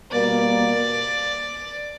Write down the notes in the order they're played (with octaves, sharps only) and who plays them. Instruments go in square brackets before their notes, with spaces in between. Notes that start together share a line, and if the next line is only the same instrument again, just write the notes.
[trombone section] B2 G3 A#3 [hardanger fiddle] D5